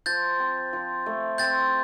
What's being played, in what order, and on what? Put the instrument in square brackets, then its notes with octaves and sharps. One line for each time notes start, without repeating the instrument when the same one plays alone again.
[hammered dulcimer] F3 [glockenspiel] G6 A6
[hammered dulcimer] C4
F3
A3
[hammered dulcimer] C4 [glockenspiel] G6 A6